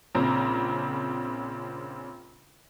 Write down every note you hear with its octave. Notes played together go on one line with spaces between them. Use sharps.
A#1 C#3 C4 A#5